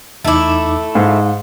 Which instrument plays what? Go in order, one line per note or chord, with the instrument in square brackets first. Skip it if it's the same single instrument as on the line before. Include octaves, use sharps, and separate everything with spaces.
[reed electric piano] E2 D#4 D6 [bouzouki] A3 E4
[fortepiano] G#2 [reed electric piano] F5